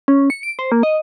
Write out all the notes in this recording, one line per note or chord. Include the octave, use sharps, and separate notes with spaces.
C#4
C#7
D7
C5
A#3
D#5